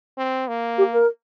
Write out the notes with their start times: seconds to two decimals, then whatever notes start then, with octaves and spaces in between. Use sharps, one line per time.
0.18 C4
0.48 A#3
0.78 G4
0.92 A#4